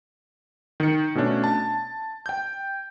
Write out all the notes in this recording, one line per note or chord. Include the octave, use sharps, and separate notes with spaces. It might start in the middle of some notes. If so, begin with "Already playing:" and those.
D#3 C#7
B2 A3 C#4 D4
A5
G5 G6